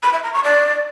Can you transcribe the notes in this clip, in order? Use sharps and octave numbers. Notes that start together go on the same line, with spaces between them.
B5
E5
A#5
C#6
D5